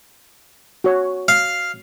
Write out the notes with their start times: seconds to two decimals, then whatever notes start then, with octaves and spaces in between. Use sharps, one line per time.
0.84 F#4 C#5
1.28 F5